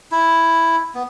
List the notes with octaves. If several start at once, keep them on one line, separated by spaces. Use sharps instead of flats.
E4
B3